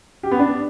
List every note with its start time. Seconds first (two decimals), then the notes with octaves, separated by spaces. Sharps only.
0.23 G4
0.31 B3
0.39 D4